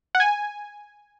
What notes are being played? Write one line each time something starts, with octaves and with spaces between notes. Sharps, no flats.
F#5
G#5